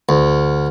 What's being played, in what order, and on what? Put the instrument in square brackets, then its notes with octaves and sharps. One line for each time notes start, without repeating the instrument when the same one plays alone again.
[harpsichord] D2